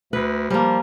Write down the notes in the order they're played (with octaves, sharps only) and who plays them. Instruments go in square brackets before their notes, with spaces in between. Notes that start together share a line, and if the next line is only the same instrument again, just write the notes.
[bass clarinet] D2 [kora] B4
[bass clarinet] F3 [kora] G3 A#3